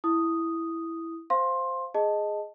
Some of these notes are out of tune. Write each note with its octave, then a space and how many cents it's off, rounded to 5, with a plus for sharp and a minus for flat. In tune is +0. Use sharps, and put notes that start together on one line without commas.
E4 +0 D#6 +0
C5 +0 F5 +0 C6 +15
G#4 +0 D#5 +0 A5 +0